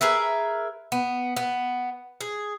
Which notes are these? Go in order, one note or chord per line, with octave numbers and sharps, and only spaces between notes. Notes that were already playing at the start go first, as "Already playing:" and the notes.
G#4 A#4 B4 E5
B3
B3
G#4